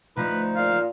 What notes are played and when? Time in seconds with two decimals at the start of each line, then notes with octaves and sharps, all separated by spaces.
0.16 D2 F3 D#4 B4
0.56 A#2 F5